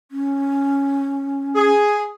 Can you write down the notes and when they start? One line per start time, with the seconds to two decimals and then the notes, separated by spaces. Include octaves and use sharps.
0.12 C#4
1.54 G#4